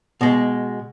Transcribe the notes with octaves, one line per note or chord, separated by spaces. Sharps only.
B2 G#3